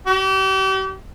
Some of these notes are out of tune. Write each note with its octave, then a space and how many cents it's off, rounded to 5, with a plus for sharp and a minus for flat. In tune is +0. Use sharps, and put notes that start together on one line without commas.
G4 -40